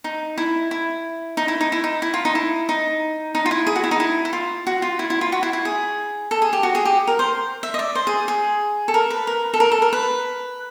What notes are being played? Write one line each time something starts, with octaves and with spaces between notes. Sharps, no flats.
D#4
E4
E4
D#4
E4
D#4
E4
D#4
E4
F4
D#4
E4
D#4
D#4
F4
E4
G#4
F#4
E4
D#4
E4
E4
F4
F#4
F4
E4
E4
F4
F#4
E4
E4
G#4
A4
G#4
G4
F#4
G#4
G4
A#4
C5
E5
D#5
D5
C5
G#4
G#4
A4
A#4
B4
A#4
A4
A#4
A4
A#4
B4